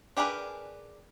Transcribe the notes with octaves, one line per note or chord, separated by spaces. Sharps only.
D4 G4 G#4 A#4 B4